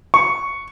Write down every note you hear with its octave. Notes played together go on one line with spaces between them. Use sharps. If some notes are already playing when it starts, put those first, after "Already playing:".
C#6